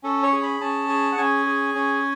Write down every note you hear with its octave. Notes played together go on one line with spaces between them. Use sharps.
C#4 A4
C#5
G#4
B5
C#4 A5
G#4
F#5
C#4 G#5
G#4
C#4